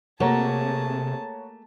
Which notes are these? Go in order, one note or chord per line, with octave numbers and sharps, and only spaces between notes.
C3 A3 A#3 F#4 G#4 C#5 A5 A#5